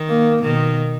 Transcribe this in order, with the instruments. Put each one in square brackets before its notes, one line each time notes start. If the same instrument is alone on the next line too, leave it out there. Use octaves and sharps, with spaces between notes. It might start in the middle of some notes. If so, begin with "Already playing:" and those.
Already playing: [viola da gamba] D#3
[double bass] A#3
[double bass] B2 [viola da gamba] D#3